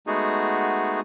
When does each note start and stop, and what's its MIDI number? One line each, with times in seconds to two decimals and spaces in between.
0.07 1.00 56
0.07 1.00 57
0.07 1.00 59
0.07 1.00 63
0.07 1.00 66
0.07 1.00 68